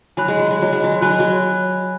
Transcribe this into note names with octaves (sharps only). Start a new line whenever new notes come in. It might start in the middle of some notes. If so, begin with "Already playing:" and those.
F#3 G#5 B5 F#6
G#3
F#3
G#3
F#3
G#3
F#3
F#3 G#5 B5 F#6
G#3
F#3